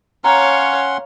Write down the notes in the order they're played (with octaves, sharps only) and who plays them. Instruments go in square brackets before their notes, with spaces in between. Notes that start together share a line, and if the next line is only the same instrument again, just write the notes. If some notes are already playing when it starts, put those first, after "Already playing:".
[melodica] C#4 F#5 C6 [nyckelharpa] C#5 F5 [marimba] A#5